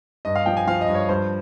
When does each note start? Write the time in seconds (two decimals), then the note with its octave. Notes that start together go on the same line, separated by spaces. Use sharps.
0.25 G2 D#5
0.35 F5
0.46 F3 G5
0.57 G#5
0.67 F3 F5
0.81 D#5
0.89 G2
0.95 C#5
1.09 G2 C5